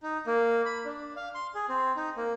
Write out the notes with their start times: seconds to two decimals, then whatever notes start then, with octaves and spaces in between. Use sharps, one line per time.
0.03 D#4
0.27 A#3
0.65 B5
0.85 D4
1.16 F5
1.35 C6
1.55 G#4
1.69 C4
1.97 D#4
2.17 A#3